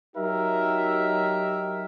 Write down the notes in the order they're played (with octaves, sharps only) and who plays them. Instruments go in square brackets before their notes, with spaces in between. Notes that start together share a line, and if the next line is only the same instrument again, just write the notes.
[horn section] F#3 D#4 G4 A#4 E5